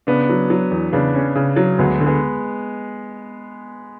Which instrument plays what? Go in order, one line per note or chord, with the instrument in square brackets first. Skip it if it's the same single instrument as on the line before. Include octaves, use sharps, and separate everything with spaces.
[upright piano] C#3 [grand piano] B3 D4
[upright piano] F#3
F#3
E2
[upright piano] C#3 [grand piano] B3 D4
[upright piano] C#4
C#3
F#3
[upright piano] D2 [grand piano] G#3 B3
[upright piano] D3
[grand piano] G#3 B3